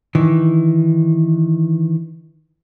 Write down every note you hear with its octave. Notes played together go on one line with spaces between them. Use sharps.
D#3 E3